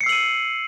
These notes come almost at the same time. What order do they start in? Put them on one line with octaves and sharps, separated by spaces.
C#7 C7 E6 F#7 D#7